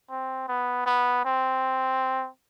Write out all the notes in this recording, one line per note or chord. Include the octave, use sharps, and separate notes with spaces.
C4
B3
B3
C4